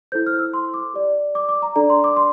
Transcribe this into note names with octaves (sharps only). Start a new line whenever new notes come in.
E4 A4 C5 G6
F6
E6
C6
D6
G4 D5
D6
D6
A#5
D4 A4 D5 A#5
C6
D6
C6